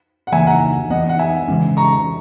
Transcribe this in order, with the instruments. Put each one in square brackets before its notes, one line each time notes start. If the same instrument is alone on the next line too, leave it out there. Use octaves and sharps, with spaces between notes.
[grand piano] F#5
[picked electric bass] C#3 E3 A#3 [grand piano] E5 G#5
[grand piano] F#5 A#5
[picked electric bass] E3 B3 [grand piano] D#5 F#5
[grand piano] F#5
E5 G#5
[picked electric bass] C#3 E3 G#3 C#4
[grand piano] A#5 C#6